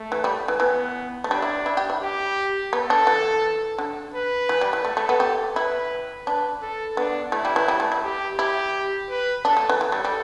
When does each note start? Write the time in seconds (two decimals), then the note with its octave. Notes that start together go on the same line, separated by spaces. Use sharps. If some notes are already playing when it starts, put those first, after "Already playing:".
Already playing: A3
0.12 E3
0.24 G3
0.48 E3
0.60 E3 B3
1.24 A3
1.31 G3 D4
1.42 E4
1.66 E4
1.77 G4
1.90 E4
2.01 G4
2.73 B3 A4
2.90 D4
3.07 E3
3.78 D3
4.14 B4
4.49 E3
4.61 G3
4.73 E3
4.85 A3 A4
4.97 A3
5.09 B3
5.20 G4
5.55 E4 B4
6.26 D4 B4
6.62 A4
6.97 B3 D4
7.32 A3 E4
7.45 G3
7.56 E3
7.68 G3
7.80 A3
7.92 E4
8.04 G4
8.39 E4 G4
9.10 B4
9.45 D4 A4
9.57 A3
9.69 E3
9.81 E3 A4
9.92 G3
10.05 G3